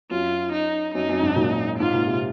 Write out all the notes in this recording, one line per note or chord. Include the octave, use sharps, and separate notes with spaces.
F#2 F4
D#4
F#2 D#4
F#2
G#2
F#2 A#2
G#2 F4
A#2
C3